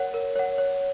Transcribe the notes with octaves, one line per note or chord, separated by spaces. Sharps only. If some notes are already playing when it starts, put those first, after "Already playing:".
Already playing: A#4 C#5 F#5
A#4
C#5 F#5
C#5